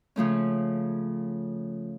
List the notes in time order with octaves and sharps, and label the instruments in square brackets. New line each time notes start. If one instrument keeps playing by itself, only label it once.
[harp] C#3 F3 A3 C#4